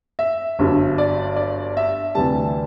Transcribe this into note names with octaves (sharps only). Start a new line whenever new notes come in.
E5
G1 G2 F#3
D5
D5
E5
D2 C3 E3 G3 A5